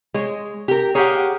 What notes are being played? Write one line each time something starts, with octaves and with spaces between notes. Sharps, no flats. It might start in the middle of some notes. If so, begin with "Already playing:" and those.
G#3 C#5
G4 A#4
A#3 G4 G#4 C#5 F#5